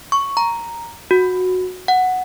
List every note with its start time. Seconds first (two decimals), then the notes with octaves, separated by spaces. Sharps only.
0.12 C#6
0.37 A#5
1.11 F#4
1.88 F#5